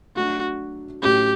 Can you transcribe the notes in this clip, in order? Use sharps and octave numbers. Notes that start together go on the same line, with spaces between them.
F#3 A3 D4 F#4
A2 F#3 C#4 G4